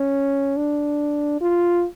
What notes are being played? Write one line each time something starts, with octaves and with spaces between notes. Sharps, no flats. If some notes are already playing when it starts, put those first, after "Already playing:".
Already playing: C#4
D4
F4